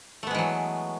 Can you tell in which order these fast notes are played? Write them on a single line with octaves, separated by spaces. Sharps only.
A3 B3 G#3 E3 F#3